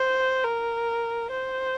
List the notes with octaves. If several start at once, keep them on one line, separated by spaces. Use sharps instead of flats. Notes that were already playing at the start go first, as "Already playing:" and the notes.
Already playing: C5
A#4
C5